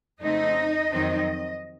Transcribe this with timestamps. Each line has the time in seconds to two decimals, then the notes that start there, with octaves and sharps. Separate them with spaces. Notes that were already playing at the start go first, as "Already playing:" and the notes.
0.21 F2 C#3 A3 C4 D#4 D#5
0.93 F2 D#3 F#3 C4 D#4